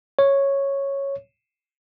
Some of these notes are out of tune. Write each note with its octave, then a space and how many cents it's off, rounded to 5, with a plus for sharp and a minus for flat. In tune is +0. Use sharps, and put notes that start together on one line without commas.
C#5 -5